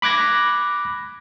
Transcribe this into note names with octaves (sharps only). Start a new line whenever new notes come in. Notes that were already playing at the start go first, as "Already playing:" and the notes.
B5 D6 F#6 G#6 A#6